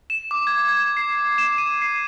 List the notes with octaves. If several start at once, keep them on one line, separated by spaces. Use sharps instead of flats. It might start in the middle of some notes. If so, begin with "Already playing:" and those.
E7
D6
G#6
G#6
C7
E7
D#7
C7